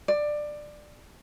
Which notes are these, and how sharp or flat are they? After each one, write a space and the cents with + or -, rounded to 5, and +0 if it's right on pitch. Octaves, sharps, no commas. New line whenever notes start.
D5 +15